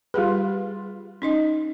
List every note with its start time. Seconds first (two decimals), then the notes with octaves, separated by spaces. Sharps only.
0.14 G3 F4 G4 G#4 B4
1.22 C#4 D#4 D#5